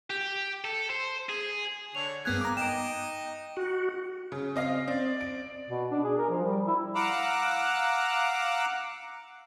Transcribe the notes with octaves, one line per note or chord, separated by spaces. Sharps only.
G4
A4
C5
G#4
D3 D4 C#5 F7
G2 A#3 B3 G#4 F#6 G#6
A#5 D6
D#4 D#5 G5 D7 E7
F#4
C#3
C4 D#5 F5
C4 D5
D7
B2
D4
G#4
A#4
F3
G3
E4
F5 F#5 A#5 D6 E6 F#6